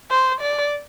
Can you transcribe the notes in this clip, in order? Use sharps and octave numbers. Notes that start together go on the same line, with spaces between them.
C5
D5